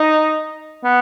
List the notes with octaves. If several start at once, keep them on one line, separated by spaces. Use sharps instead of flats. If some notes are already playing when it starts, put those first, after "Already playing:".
Already playing: D#4
B3